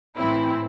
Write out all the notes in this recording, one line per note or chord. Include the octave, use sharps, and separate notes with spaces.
A2 E3 C4 E4